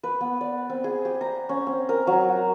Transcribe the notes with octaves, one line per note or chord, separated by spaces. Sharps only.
B4
B3
D5
C4
G#4
G4
A#5
C#4
C4
A#4
F#3
F#4